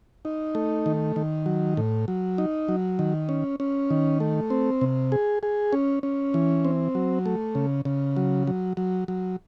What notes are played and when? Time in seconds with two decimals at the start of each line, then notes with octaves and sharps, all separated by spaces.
0.25 D#4
0.55 A3
0.86 D#3
1.16 D#3
1.46 F#3
1.77 A2
2.08 F#3
2.38 D#4
2.69 F#3
2.99 D#3
3.29 C#4
3.60 C#4
3.91 D#3
4.20 A3
4.50 C4
4.81 C3
5.12 G#4
5.43 G#4
5.73 C#4
6.03 C#4
6.34 E3
6.65 C4
6.95 F#3
7.26 A3
7.55 C#3
7.85 C#3
8.16 F#3
8.47 F#3
8.77 F#3
9.08 F#3